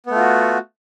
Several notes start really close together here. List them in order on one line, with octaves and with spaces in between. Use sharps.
B3 A3 F4 F#4